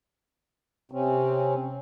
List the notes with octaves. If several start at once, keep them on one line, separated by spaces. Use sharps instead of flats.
C3 C4 C#4